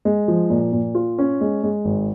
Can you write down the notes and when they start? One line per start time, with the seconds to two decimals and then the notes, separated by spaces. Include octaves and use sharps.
0.05 G#3
0.28 F3
0.50 A#2
0.72 A#2
0.95 F4
1.18 C#4
1.41 G#3
1.63 G#3
1.85 G#1